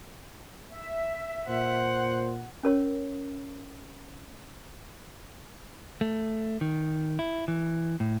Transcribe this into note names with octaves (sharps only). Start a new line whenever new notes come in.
E5
A#2 C5 F#5
C#4 A#4 C#5
A3
D#3
E4
E3
A2